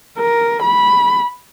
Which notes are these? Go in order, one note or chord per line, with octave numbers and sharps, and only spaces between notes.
A#4
B5